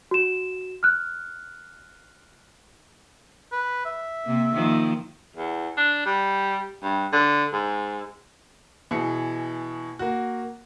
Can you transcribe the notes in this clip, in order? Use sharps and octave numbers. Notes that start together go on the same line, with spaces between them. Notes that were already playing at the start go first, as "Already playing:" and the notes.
F#4 E7
F6 F#6
B4
E5
C3 A#3
D#3 F3 A#3
E2
D4
G3
G2
D3
G#2
B2 E3 G#4 C#7
A#3 F#4